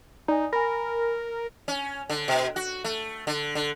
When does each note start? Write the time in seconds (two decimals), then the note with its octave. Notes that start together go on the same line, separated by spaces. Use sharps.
0.28 D#4 D5 G#5
0.53 A#4 G#5 B5
1.68 C#4
2.10 D3
2.28 B2
2.56 F#4
2.84 A3
3.27 D3
3.55 D3